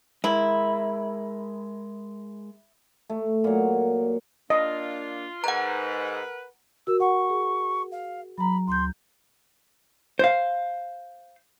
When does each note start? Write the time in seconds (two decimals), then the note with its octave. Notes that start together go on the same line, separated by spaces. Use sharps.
0.24 G#3 E4 A#4
3.09 A3
3.44 A#2 F#3
4.50 A#3 D4 F4 D#5
5.44 G#2 A#4 B4 F#5 A#5
6.87 F#4 A#4 E6
7.00 F#5 C#6
7.30 G#4
7.92 F5
8.38 F#3 A#5 B5
8.67 D2 C6 G6
10.19 C5 F5